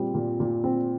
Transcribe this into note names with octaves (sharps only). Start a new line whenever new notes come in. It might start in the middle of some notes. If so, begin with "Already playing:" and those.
Already playing: A#2 G3 C4
A#2
A#2
C4